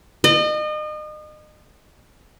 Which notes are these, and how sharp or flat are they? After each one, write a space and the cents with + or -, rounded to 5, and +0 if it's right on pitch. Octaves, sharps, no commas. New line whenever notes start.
D#5 -35